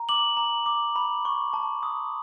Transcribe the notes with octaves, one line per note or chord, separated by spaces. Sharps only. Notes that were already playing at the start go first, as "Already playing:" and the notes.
Already playing: A#5
D6 F#7
A#5
D6
B5
C#6
A5
D#6